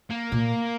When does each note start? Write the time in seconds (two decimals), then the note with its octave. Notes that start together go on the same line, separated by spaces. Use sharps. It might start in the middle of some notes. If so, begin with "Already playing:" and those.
0.10 A#3
0.32 A#2